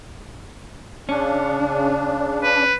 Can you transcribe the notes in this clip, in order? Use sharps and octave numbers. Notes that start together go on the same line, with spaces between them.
C#3 C#4 D4
B4